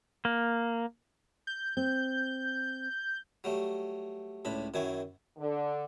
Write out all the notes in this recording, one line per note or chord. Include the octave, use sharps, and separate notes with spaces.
A#3
G6
C4 G6
F#3 G3 A3
C#2 A2 D4 B5
F#2 D#3 F#3 E4 G#5
D3